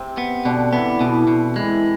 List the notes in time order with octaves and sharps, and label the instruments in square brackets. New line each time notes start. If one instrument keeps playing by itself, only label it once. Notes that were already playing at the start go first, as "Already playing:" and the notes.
Already playing: [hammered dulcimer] C3 C4
[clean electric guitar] B3
[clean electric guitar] B2 [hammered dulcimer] D3 D4
[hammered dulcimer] E3 E4 [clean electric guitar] B3
[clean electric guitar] B2 [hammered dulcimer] E3 E4
[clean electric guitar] B2
[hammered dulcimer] E3 E4 [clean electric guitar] G#3